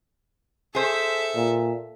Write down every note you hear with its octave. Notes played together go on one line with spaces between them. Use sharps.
G#4 A4 C5 E5
A#2